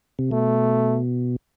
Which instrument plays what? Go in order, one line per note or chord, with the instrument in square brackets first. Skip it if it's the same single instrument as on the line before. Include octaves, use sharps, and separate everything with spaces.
[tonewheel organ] C3
[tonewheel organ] B2 [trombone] A3